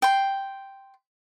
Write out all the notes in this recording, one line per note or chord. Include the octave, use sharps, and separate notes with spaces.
G5 C6